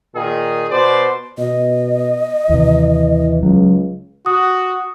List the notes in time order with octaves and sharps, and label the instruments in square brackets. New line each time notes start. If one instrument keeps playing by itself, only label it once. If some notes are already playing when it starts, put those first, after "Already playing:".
[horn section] A#2 D#3 G#4
B2 C5 D5
[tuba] B2 [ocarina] D#5
[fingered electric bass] D#2 C3 [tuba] E3
[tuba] C#2 [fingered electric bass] F#3
[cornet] F#4 [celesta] D#6